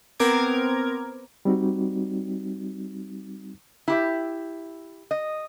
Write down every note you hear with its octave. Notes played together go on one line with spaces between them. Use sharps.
B3 C4 A#4 D6 G#6
G3 C4 D#4 F#4
E4 G4 E5
D#5